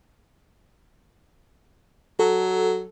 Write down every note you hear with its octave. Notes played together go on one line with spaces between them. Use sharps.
F#3 A4